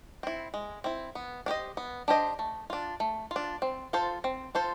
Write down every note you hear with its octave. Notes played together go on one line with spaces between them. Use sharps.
C4 E4
G#3
C4 E4
B3
D4 G4 C5 D#5
B3
D4 G4 C5 D#5
A3
D4 F4
A3
F4
D4
C4
F4 A4 C5
C4
F4 A4 C5